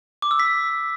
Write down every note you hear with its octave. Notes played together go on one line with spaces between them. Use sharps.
D6
E6
B6